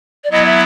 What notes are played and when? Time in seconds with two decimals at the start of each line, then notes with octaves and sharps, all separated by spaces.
0.24 D5
0.31 F#3 B3 E4 D#5
0.46 E5